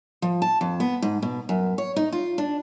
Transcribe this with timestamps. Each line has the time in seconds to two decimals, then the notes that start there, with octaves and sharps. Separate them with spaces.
0.22 F3
0.42 A5
0.61 F2
0.80 B3
1.02 G#2
1.23 B2
1.49 F#2
1.78 C#5
1.96 D#4
2.12 F4
2.38 D4